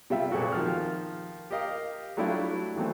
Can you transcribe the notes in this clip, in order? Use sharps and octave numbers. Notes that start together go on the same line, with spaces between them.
C3 G3 F4 E5
A#2 G#3 C4 F#4 A4
D#3 F3 F6
G4 A#4 D#5 F5
F#3 G3 A3 D4 E4 F4
D#3 E3 F#3 A3 C4